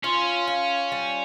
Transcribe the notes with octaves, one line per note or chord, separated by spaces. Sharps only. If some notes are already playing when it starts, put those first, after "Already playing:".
C#4 F4
F4
G3